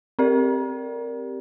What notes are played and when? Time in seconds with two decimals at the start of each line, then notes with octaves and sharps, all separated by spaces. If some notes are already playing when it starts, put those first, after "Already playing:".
0.19 C4 G4 A#4 D5